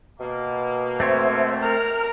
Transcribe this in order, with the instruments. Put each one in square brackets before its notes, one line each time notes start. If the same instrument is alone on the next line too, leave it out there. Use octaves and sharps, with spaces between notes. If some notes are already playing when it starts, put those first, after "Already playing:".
[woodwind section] B2 A#3
[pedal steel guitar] A3 C4 C#5 [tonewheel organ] C5 E5
[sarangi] A#4 [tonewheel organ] F6